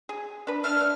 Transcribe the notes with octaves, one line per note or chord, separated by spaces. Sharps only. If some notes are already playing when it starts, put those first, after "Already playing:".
G#4
D4 B4
D4 E5 A5 F6
D4